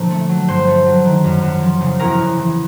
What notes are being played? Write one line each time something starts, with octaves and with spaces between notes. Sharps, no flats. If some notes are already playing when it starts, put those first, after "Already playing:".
Already playing: A#2 D3 F3
A3
F#3
G2 C5
A3
F#3
D#3
F#2
F#2
F3
C#3
E2 A#4
E2
E3